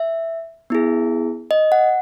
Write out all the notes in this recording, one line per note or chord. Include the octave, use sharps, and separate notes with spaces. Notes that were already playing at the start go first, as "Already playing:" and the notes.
Already playing: E5
B3 E4 G#4
D#5
F#5